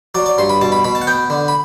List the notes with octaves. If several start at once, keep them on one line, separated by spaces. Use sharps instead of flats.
F#3 D5
D5
G2 C6
B5
B2 A5
B5
B2 B5
A5
F#5
B3 G5
D3
B5